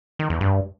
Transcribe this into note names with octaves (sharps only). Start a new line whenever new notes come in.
D#3
E2
G2